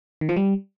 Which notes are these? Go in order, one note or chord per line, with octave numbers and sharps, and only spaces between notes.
D#3
F3
G3